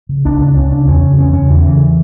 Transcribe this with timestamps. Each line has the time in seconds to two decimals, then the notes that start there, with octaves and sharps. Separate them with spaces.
0.09 C#3
0.25 C#2 D4
0.40 C#3
0.48 D4
0.56 C#2 C#4
0.71 C#3 D4
0.88 E2 C#4
1.03 C#3
1.18 E2 C#4
1.33 C#3 C#4
1.49 E2 E3
1.65 C#3 E3